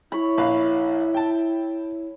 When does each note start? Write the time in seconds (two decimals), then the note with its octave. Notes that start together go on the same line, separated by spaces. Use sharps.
0.12 E4 C#5 B5
0.38 A#1 B4 F5
1.14 G5 A5